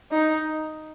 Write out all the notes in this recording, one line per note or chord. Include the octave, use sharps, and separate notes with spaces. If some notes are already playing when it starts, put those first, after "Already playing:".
D#4